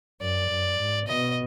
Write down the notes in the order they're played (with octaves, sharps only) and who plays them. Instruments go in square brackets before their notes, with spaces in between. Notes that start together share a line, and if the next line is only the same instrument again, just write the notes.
[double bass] F#2 [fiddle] D5
[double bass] F#2
G#2
[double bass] B2 [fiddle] D#5